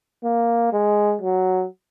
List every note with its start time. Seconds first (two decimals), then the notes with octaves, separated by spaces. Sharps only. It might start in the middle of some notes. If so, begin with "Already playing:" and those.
0.24 A#3
0.73 G#3
1.22 F#3